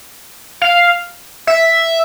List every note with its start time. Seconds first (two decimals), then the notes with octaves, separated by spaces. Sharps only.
0.62 F5
1.47 E5